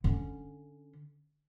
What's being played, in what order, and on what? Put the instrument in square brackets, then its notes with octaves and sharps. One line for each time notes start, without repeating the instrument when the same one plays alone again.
[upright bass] D3 C#4